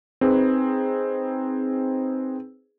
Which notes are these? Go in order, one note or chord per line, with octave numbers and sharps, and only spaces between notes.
C4 D#4 G#4 B4